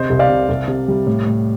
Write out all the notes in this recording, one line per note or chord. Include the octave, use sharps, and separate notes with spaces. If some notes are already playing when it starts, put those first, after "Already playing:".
Already playing: C3 C5 D#5
C2
D5 F5
C3
C2
C3
G3
A2
A2